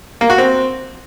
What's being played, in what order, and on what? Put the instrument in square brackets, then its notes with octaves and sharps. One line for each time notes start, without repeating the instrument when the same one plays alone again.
[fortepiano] A#3
F#4
C4